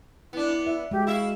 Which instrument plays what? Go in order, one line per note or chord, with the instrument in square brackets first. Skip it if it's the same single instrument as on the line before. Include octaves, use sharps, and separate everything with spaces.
[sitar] B3 D4 [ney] E4
[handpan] E5
[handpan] G#3 [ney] F#4 [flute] G4
[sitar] E4 E5 [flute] F5